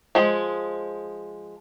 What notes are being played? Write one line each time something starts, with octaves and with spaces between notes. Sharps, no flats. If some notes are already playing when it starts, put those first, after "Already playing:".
F3 G#3